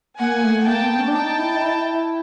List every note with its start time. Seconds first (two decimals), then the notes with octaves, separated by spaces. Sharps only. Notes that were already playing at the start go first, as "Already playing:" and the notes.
0.19 A#3 F#5 G#5
0.43 A3
0.66 A#3 G5 A5
0.82 B3
0.99 C#4
1.07 D4
1.14 D#4 G5 A5
1.38 E4
1.56 D#4
1.62 E4
1.86 E4